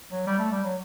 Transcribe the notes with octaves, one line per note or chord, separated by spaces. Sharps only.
F#3
G3
A3
G3
F#3